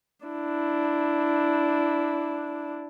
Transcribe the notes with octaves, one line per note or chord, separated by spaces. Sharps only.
D4 E4